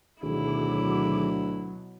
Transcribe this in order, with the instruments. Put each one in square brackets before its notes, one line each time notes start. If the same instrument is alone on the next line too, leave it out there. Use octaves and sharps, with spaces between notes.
[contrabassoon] D2 [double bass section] B2 F#3 [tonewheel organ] D#3 G#4 D6 [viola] E4